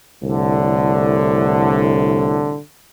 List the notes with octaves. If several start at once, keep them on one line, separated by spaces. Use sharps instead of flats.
C2 A2 D3